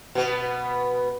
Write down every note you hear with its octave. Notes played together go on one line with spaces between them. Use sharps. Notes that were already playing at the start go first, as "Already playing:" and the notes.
B2 B3